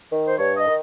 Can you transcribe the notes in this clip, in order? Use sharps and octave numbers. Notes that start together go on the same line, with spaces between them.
D#3
C5
G2 C#5
D#5
D#3